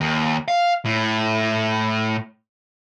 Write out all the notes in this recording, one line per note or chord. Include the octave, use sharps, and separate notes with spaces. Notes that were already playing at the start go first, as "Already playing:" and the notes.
D#2
F5
A2